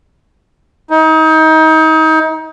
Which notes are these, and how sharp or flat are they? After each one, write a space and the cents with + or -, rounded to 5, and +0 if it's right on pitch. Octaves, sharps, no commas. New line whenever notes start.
D#4 +30